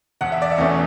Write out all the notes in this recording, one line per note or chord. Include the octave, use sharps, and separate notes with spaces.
E1 F#5
E5
D5
E5
E2 B2 A3 C#4